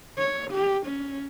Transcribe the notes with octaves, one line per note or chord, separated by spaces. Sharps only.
C#5
G4
C#4